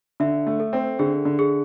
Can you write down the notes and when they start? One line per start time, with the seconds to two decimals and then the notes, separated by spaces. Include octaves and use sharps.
0.20 D3 E5
0.47 A3
0.60 A4
0.73 C4
0.99 D3 G#4
1.25 D3
1.39 G#4